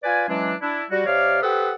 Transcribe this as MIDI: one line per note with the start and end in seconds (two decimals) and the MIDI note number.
0.04 0.28 65
0.04 0.28 71
0.04 0.28 74
0.04 0.28 80
0.29 0.54 52
0.29 0.54 54
0.29 0.54 56
0.29 0.54 61
0.29 0.54 62
0.62 0.84 62
0.62 0.84 64
0.91 1.03 55
0.91 1.03 66
1.06 1.40 48
1.06 1.40 67
1.06 1.40 73
1.06 1.40 74
1.06 1.40 77
1.42 1.73 67
1.42 1.73 69
1.42 1.73 71
1.42 1.73 72
1.42 1.73 78
1.42 1.73 87